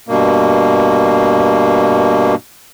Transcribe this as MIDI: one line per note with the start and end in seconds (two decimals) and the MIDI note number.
0.08 2.35 43
0.08 2.35 47
0.08 2.35 58